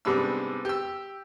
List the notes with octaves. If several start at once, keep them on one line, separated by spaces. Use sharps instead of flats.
G#2 C3 G3 B3 D4 E6
G4 E6